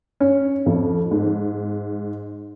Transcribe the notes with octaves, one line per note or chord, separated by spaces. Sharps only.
C#4
F2
G#2